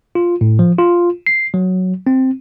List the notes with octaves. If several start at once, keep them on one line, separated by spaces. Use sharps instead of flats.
F4
A2
F3
F4
C7
F#3
C4